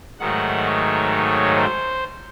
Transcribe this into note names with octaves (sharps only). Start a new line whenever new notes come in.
G#2 D#3 F#3 A3 F#5
C#5
C#5
C5